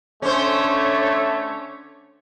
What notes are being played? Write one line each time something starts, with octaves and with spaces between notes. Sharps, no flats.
D3 A3 C#4 C5 C#5